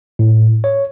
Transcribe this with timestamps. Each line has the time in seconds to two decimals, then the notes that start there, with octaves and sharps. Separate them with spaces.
0.19 A2
0.64 C#5